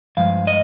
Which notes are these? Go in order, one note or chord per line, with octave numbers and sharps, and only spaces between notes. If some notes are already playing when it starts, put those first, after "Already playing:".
G2 F3 G#3 F5
D#5